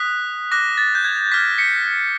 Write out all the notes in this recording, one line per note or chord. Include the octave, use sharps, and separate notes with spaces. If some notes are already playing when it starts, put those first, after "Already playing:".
Already playing: D#6 F#6 B6
D6 F#6 A#6
A6
G6
G#6
D6 F6 B6
B6 C#7